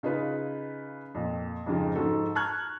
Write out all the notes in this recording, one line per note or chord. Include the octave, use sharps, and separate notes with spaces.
C#3 D#4 F4 B4
F2 A#2
F2 G#2 C#3 F3
G#2 F3 F#4 A4
A5 A#5 C#6 F6 F#6 G#6